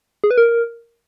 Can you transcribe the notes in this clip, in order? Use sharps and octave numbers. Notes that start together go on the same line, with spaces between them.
G#4
B4
A#4